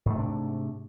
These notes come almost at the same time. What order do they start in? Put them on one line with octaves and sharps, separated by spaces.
G#2 A3 C3 D4